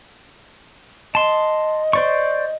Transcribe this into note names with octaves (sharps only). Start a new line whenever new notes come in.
D#5 A5 C6
C5 D5 C#6